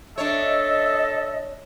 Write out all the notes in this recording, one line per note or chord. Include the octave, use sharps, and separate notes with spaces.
D4 A4 C#5 D#5 E5